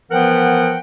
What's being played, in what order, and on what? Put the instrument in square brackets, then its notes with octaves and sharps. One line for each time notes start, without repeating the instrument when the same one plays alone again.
[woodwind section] E3 F3 B3 A#4 F#5 G5